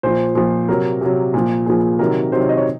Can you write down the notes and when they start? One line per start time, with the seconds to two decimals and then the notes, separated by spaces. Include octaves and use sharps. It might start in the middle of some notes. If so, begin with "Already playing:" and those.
0.03 A#2 F3 C5
0.35 A#2 F3
0.68 C3 F#3 A#4
1.01 C3 F#3
1.34 A#2 F3
1.66 A#2 F3 G#4
1.99 C3 D#3 F#3 A#4
2.32 C3 D#3 F#3 C5
2.40 C#5
2.49 D#5
2.57 C#5